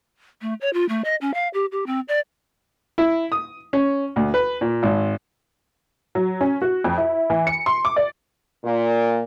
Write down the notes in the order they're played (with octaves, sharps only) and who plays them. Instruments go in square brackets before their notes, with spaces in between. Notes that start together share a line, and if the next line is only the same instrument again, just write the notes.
[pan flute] A3
C#5
F4
A3
D#5
C#4
F5
G4
G4
C4
D5
[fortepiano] E4
D#6
C#4
D2
B4
A#2
G#1
[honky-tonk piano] F#3
C#4
F#4
F2
E4
E3
C#7
C6
D6
D5
[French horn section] A#2